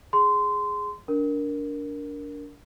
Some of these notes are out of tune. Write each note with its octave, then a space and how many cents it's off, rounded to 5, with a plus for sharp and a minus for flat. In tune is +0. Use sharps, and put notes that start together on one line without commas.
G#4 +0 C6 -20
D4 -25 A#4 +0